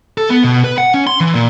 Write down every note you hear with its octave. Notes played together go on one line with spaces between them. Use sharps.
A4
B3
B2
B4
F#5
C#4
C6
E3
A#2